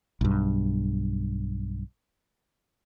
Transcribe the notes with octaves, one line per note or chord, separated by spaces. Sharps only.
B1 G2